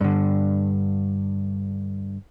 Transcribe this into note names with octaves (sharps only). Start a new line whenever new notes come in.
G2 D3